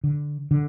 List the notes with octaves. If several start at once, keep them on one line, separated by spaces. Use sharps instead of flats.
D3
D3